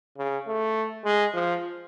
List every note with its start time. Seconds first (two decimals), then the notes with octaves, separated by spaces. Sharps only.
0.18 C#3
0.47 A3
1.05 G#3
1.34 F3